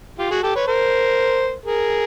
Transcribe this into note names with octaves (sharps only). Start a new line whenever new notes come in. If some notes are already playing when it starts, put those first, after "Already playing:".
F4 G4
F#4 G#4
G4 A4
B4 C#5
A#4 C5
G#4 A#4